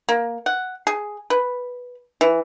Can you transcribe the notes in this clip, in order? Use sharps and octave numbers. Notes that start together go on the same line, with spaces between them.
A#3
F#5
G#4
B4
E3